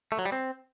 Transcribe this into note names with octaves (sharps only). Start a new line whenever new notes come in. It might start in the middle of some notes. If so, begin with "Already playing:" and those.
A3
F#3
G3
C4